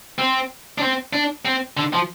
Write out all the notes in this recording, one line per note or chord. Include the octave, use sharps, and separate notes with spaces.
C4
D4
C4
D4
C4
D3
F3